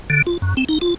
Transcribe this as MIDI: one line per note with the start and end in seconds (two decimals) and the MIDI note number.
0.10 0.22 50
0.27 0.38 65
0.42 0.55 42
0.57 0.64 60
0.69 0.78 63
0.81 0.94 65